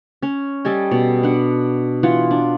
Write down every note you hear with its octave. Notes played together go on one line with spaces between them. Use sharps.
C#4
G3 A4 D#5 G#5
B2
D4 F#5
E3 F4 F#5
D4